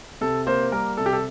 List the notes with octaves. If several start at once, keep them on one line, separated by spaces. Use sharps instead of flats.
C3 A4
A#3 C5
G3 A#4
C3 A4
G4
A4